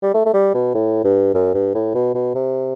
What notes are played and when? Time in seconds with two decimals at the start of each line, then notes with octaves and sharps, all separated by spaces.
0.03 G3
0.14 A3
0.26 A3
0.34 G3
0.54 B2
0.74 A2
1.04 G2
1.34 F#2
1.54 G2
1.75 A2
1.95 B2
2.15 B2
2.35 C3